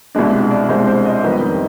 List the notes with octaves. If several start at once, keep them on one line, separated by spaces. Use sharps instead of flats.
C2 B2 G#3 D4
D5
C2 B2 G#3 D4 C5
C5
D#5
F2 D#3 G3 B3